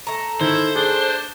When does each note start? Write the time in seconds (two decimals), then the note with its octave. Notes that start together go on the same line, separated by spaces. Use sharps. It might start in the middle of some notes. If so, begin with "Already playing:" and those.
0.07 A3 A#5
0.41 D#3 E4 C5
0.75 D4 G#4